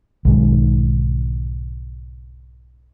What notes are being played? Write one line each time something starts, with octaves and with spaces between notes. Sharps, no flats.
B1 G#2 D#3